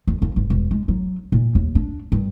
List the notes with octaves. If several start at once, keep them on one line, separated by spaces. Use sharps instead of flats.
E2
F2
G1
E1
G#3
F#3
A#2
D#2
D4
G2